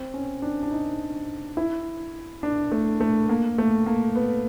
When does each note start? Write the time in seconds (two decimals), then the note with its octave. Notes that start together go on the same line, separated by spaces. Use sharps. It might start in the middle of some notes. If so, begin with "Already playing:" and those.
Already playing: C4
0.14 C#4
0.42 D4
0.63 D4
0.71 D#4
1.57 E4
2.43 D4
2.72 A3
3.00 A3
3.29 A#3
3.58 A3
3.86 A#3
4.16 B3